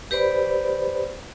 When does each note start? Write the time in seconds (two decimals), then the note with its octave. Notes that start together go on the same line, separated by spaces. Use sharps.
0.11 G4 B4 C5 D5 B5